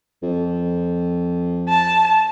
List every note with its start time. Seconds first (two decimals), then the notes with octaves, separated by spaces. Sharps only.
0.22 F2
1.69 A5